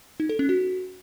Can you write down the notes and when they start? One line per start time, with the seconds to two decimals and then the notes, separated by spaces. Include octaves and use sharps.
0.20 D#4
0.29 A4
0.39 C#4
0.49 F#4